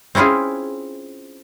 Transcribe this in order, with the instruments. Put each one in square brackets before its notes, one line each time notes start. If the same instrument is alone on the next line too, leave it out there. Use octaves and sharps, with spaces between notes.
[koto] C4 C#4 E4 F4 G#4